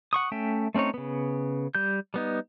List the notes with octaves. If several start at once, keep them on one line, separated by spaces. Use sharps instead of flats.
F#5 C#6 D#6
A3 C#4 E5 G5
A3 C4 C#4 D#4 C#5
C#3 B3
G3 G6
G3 B3 D#4